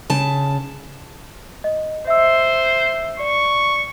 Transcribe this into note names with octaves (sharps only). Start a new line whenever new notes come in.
C#3 A5
D#5
C5 E5 E6
D5 C#6